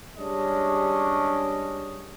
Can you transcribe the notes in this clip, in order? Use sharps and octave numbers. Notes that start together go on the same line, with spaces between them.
G3 G#3 C#4 D4 D#5